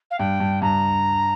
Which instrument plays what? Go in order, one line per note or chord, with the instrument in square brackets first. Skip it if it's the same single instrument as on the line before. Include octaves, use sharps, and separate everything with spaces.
[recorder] F5
[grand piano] G2 [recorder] G5
[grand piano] G2
[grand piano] G2 [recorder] A#5